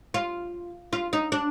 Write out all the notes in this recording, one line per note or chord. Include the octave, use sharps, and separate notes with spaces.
F4
F4
D#4
D4